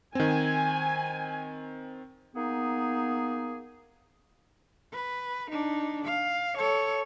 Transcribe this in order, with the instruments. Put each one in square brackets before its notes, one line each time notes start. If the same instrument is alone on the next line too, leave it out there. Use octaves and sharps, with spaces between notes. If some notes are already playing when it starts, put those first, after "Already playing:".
[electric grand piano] D#3 C4 [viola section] G#5
[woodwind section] A#3 B3 D#4 G#4
[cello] B4
D4 D#4
F5
A4 C#5